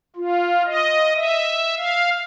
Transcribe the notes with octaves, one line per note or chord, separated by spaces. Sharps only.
F4
D#5
E5
F5